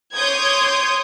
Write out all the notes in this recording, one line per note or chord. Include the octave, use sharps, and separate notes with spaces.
C#5 C6 D6 D#6 G6 G#6